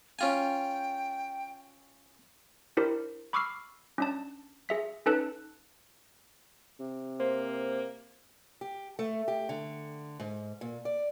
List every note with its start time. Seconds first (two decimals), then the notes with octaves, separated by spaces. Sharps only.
0.19 C#4 F4 G5 G#5
2.77 D4 E4 G4 A#4 C5
3.33 B5 C#6 D6 E6 F6 C7
3.98 C#4 D4 A5
4.69 G#4 E5 B6
5.06 C#4 D#4 A4 B4 A5 F#6
6.80 C3
7.20 A#3 C5
8.61 G4
8.99 A3
9.28 G4
9.49 D3
10.20 G#2
10.61 A#2
10.85 D5